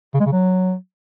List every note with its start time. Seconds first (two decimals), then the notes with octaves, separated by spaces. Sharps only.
0.14 C#3
0.20 G#3
0.26 C#3
0.32 F#3